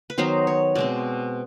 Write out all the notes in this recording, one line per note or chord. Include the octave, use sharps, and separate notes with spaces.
B4
D#3 F#3 B3 D#4 C5
C#5
B2 G#3 C4 D5